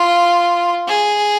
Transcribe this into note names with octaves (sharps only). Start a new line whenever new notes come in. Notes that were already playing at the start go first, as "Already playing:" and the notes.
Already playing: F4
G#4